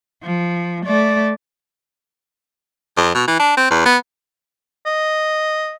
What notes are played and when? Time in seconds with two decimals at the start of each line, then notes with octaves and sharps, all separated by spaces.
0.23 F3
0.85 A3 D5
2.97 F2
3.15 B2
3.28 E3
3.39 D4
3.57 C4
3.70 E2
3.85 B3
4.86 D#5